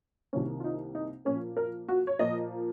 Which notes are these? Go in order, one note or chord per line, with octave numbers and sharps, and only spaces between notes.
C2 C3 D#3 A#3 C#4
F4
D#4
D#4
A#2 F3 A#3 C#4
A#4
F#4
C#5
A#2 F3 A#3 D#5